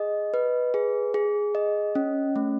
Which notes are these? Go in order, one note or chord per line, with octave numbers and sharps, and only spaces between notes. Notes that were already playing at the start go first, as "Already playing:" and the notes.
Already playing: G#4 D#5
B4
G#4
G#4
D#5
C#4
A3